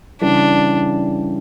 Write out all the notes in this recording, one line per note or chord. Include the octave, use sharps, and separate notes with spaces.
C#3 E3 G3 D4